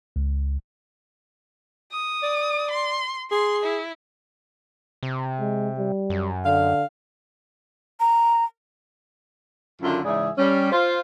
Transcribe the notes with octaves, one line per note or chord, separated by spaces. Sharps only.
C#2
D#6
D5
C6
G#4 C6
E4
C3
G#3
G3
F#2
D3 F5
A#5
F#2 D3 D#3 E4 F4
G#2 C#3 E3 G#4 D5 E5
G3 C#4
F4 C5